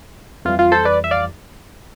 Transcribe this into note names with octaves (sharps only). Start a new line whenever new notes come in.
F2 E3 G3 F4
F4
A4 C5
B4 D5
E5
D5 F5